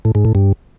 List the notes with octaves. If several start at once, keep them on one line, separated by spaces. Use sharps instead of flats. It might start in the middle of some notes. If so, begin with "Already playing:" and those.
A2
G#2
A2
G2